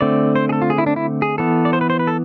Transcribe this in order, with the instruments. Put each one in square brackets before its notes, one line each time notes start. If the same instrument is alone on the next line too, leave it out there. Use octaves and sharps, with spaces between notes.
[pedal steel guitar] D3 A3 C4 D5
C5
G#4
A4
F4
G#4
E4
D4
E4
G#4
E3 B3 A4
D5
C5
B4
C5
B4
A4